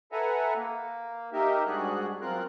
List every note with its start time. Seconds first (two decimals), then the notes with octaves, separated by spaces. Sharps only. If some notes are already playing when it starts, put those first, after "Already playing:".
0.12 A4 B4 E5 F#5 G#5 A#5
0.56 A#3
1.33 D#4 G4 A#4 E5
1.67 G#2 G3 D4 F#4 G#4 F#6
2.21 F#2 C4 F4 A#4 F#6